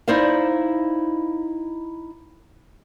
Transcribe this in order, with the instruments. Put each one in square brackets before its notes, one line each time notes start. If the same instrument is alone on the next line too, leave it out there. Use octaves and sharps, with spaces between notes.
[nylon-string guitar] D#4 E4 C5 D5 F5